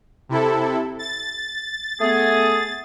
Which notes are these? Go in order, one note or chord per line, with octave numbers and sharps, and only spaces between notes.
C3 E4 A4
A6
A3 B3 G#4